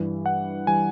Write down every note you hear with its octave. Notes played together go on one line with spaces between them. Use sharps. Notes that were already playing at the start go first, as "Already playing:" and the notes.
Already playing: G2 E3 G3
F#5
E3 G3 G#5